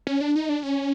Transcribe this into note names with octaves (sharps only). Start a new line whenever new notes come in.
C#4
D4
D#4
D4
C#4